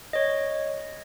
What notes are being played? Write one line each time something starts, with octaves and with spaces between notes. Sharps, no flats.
C#5 D#5